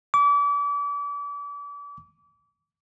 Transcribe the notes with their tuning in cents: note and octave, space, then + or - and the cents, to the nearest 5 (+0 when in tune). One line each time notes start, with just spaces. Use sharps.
D6 -35